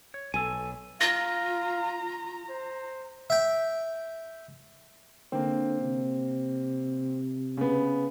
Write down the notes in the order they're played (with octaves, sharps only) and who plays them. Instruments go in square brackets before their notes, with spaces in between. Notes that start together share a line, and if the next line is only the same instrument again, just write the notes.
[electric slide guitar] C#5
[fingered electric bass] B1 [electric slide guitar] A4 G#5
[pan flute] F4 [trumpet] F5 [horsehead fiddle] A#5 [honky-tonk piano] A#6
[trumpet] C5
[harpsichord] E5 G5
[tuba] D3 [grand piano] A#3 C4
[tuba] C3
[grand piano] C#3 B3